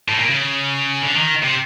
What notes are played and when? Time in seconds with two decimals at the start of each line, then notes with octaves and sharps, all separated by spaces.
0.09 A2
0.19 A#2
0.30 C#3
1.02 D3
1.17 D#3
1.43 C3